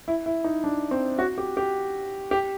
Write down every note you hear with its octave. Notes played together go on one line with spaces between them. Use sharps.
E4
E4
D#4
D4
C4
F#4
G4
G4
G4